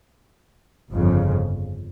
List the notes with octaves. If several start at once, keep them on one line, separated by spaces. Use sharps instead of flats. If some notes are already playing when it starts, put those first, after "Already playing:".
G1 F2 C#3